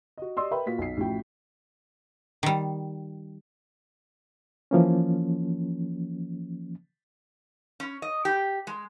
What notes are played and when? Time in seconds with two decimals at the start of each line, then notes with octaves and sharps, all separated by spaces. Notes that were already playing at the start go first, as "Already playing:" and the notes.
0.18 F#4 D#5
0.37 G4 D5 D#5 C6 E6
0.51 A#4 B4 E5 G5 B5
0.66 A#2 F4 F#4 B6
0.78 B1 C7
0.97 A1 F3 E4 F#4 G5
2.43 D#3 G3
4.71 E3 F3 A#3 C#4
7.80 C#4
8.02 D#5
8.25 G4
8.67 G#3